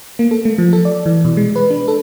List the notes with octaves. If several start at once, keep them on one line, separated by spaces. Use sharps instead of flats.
A#3
A4
A3
F3
A4
D5
E3
B2
G#3
B4
D4
A4